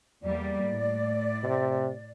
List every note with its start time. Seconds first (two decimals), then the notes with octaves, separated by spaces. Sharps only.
0.23 E2 G3 A#3 D5
0.65 A2
1.44 C3